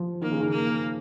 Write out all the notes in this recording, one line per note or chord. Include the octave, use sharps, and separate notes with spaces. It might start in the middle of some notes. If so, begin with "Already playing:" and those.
Already playing: F3
D#3 A#3
C#3
D#3
A#3